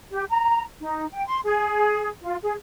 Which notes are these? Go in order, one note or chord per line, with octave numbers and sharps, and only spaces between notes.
G4
A#5
D#4
G5
C6
G#4
F4
G#4